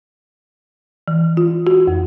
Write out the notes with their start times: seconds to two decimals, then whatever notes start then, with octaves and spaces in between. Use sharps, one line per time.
1.08 E3
1.37 F4
1.67 F#4
1.87 F2